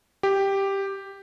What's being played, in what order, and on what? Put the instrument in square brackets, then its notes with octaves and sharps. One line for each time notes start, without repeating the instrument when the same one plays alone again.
[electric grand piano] G4